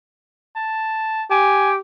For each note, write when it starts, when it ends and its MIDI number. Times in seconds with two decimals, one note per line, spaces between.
0.56 1.25 81
1.31 1.76 67
1.31 1.71 80